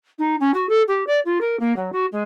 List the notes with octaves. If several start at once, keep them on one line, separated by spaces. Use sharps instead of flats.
D#4
C#4
F#4
A4
G4
D5
F4
A#4
A#3
F#3
F#4
G#3